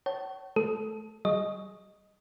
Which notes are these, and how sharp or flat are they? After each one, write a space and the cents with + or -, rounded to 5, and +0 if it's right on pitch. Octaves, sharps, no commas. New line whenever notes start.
C#5 +0 F#5 +45 A5 +0
A3 -25 A4 -10
G3 -35 G#4 +10 D#5 +0